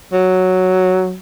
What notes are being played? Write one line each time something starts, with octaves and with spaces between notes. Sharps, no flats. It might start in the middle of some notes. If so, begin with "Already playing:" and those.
F#3